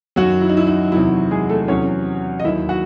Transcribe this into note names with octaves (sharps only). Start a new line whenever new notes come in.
F#2 D#3 F#3 F#4
E4
D#4
E4
D#4
E2 C3 D#3 F#3 E4
G#3 G#4
A3 A4
E2 C3 F#3 C#4 C#5
D#5
D#2 D#3 F#3 E4 E5
F#4 F#5